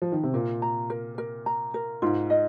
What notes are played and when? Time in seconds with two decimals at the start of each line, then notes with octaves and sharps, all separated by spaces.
0.02 F3
0.12 D#3
0.23 C3
0.34 A#2 A#4
0.62 A#5
0.90 A#4
1.18 A#4
1.46 A#5
1.74 A#4
2.02 G#2 F4
2.30 D#5